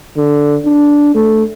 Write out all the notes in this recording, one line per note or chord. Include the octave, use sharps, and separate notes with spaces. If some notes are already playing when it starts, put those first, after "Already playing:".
D3
D4
A3